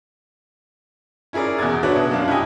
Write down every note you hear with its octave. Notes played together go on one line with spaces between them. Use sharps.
C#4 E4 G#4 A#4 D5
E2 B2 D6 G#6 A6
D4 F#4 A4 B4 C#5 E5
B2
F#2 D4 F5 A5
E4 G4 D#5 G#5